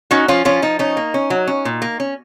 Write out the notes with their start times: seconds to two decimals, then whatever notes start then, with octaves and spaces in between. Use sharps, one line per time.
0.11 C#4 D#4 F#4
0.28 F3 C#4 F4
0.45 F3 C#4 F4
0.62 F3 D#4
0.79 C#4 D#4
0.97 A#3
1.14 C#4
1.30 F#3
1.47 C#4
1.65 A#2
1.82 A#3
2.00 C#4